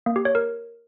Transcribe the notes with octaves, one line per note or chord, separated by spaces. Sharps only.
A#3
G4
C#5
A#4